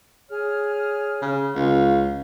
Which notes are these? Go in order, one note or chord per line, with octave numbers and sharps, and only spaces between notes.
G#4 C#5 F6
C#3
C#2 F5